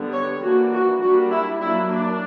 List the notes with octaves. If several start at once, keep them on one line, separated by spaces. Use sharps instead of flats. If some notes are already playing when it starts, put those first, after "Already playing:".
Already playing: D3 G3 B3
C#5
E3 A#3 D4 F#4
F#4
G3 A#3 D4 F#4
E4
F#3 A#3 D4 E4
D4